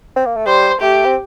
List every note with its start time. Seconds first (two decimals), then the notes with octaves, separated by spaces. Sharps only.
0.16 C4
0.26 A#3
0.37 A3
0.46 G3 C5
0.81 A3 G4
1.05 C4